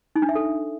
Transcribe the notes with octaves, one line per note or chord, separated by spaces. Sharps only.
D#4
D4
E5
A4